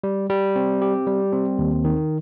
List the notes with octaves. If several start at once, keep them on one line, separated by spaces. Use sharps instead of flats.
G3
G3
C4
G4
G3
C4
D#2
D#3